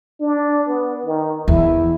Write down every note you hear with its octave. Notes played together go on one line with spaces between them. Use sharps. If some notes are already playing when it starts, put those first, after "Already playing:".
D4
B3
D#3
E2 E4